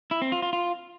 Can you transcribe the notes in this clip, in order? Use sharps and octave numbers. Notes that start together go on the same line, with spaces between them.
E4
C4
F4
F4
F4